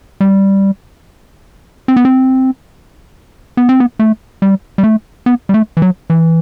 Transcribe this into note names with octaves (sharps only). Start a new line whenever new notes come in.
G3
C4
B3
C4
B3
C4
B3
A3
G3
G3
A3
B3
G3
A3
E3
F#3
E3